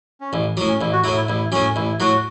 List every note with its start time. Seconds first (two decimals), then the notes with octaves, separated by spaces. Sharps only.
0.21 C#4
0.33 A1 E4
0.57 A2 F#3
0.68 C#4
0.80 A1 E4
0.92 F#4
1.04 A2 F#3 E4
1.17 E4
1.29 A1 E4
1.52 A2 F#3 C#4
1.76 A1 E4
2.00 A2 F#3 F#4